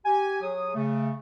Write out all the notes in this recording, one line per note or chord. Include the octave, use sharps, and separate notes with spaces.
G4 G#5
F#3 G#4 D#6
C#3 A3